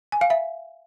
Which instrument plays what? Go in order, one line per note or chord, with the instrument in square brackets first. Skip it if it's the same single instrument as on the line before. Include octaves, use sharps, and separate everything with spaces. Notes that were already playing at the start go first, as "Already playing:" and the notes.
[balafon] G#5
F5
E5